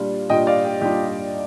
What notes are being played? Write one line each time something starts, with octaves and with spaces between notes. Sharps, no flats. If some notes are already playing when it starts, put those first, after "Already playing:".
Already playing: A#2 G3 D4 F4
A#2 G3 D4 F4 D#5 G5
D5 F5
G4
A#2 G3 D4 F4 G4
G4